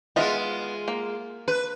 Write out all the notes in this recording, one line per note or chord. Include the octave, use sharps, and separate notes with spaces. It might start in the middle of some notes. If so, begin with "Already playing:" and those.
G#3 B3 F4 D#5 E5
A#3
B4